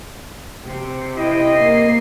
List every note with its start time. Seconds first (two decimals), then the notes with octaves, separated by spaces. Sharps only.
0.65 C3
1.18 E4 D#5 G5
1.56 A#3 C7